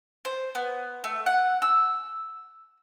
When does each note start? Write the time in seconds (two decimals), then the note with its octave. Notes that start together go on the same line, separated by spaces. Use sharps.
0.25 C5
0.55 B3
1.04 A3
1.26 F#5
1.62 E6